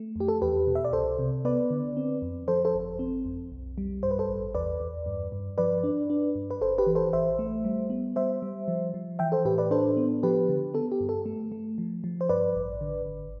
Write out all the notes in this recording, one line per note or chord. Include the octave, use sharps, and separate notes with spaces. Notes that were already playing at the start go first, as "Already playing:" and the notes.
Already playing: A3
F2 G4
A4
E2 G4 B4
B2
E5
D5
C2 A4 C5
C3
B3 B4 D5
D3
C4
F2
F3 A4 C5
A4 C5
G1
C4
F2
B1
G3
G2 C5
B4
A4 C5
A1
E2 B4 D5
E2
G2
G2
F3 B4 D5
D4
D4
G2
B4
G1 A4 C5
G4 B4
E3
A4 C5
A1 C5 E5
A3
G3
B3
G3 C5 E5
G3
F3
F3
E3 E5 G5
A4 C5
A2 G4 B4
B4 D5
D4 A4 C5
B3
F3 G4 B4
D3
B3 A4
G4
G2
A4
A3
A3
F3
F3
C5
G2 B4 D5
A1
D3
G1